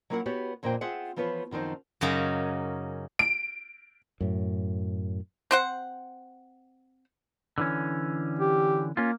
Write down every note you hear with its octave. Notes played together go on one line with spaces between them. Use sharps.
F#3 A#3 E4 F4 A#4 F#5
B3 F#4 G4 B4 C#5
F2 A#2 A#3 D4 C5 G5
C4 F4 G#4 E5 F#5
E3 F3 B3 F4 B4 C#5
F#2 D#3 F3 C4 D#4
F#2 C#3 F#3 A#3 C#4 D#4
D7
F#2 A2
C4 C5 F#5
D3 E3 C#4
G4
A#3 C#4 F4